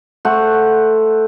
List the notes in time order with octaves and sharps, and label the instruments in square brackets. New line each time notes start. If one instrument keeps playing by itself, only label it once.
[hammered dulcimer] A3 C5 F#5